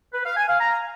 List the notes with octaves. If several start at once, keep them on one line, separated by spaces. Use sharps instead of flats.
B4
F5
G#5
F5
A#5